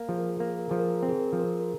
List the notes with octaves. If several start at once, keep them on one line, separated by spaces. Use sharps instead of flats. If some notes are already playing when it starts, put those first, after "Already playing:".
Already playing: A#3
F3 G#4
A#4
G#4
A#3 A#4
G#4
A#4
F3 G#4
A#4
G#4
C4 A#4
G#4
A#4
F3 G#4
A#4
G#4
A#4